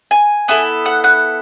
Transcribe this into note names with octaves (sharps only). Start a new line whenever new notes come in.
G#5
B3 E4 A4
F#5
F#5